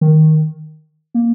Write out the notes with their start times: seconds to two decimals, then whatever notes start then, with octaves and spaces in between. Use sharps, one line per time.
0.01 D#3
1.14 A#3